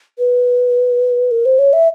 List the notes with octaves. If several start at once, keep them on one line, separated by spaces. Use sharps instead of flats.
B4
A#4
C5
C#5
E5